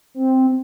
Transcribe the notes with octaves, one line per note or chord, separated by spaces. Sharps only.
C4